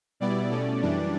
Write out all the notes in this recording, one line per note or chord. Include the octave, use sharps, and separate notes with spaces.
B2 G3 B3 E4 D5
B2 A3 C#4 D5
F#2 E3 G3 D4